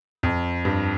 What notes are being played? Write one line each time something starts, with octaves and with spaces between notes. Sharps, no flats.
F2
G2